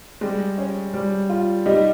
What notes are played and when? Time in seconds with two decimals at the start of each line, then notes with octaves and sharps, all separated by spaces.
0.21 G3 G#3
0.58 C#4
0.94 G3
1.29 F4
1.66 G3 D#4